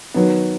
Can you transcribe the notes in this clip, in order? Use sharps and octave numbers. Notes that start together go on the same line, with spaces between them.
D#3 F#3 B3